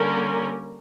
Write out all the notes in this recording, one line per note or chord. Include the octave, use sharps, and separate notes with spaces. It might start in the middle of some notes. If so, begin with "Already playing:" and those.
Already playing: D3 G3 A#3 C#4 A#4